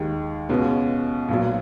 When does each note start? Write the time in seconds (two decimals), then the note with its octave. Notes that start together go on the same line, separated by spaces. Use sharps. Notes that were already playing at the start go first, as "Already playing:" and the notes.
Already playing: D#2 D#3 G#3
0.49 C#2 B2 G#3 C#4
1.28 B1 A#2 F#3